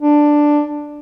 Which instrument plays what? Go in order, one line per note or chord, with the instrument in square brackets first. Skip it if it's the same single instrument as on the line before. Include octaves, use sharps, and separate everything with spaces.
[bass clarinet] D4